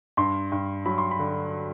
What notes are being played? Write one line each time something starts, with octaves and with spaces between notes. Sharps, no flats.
G2 C6
G2
F#3 B5
C6
B5
D3